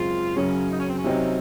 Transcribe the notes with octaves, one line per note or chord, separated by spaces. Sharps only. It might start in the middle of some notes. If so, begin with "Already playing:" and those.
Already playing: F#2 C#3 G#3 C4 F4
F#2 C#3 F#3 C#4
D#4
C#4
C4
C#4
C3 F#3 C4 D#4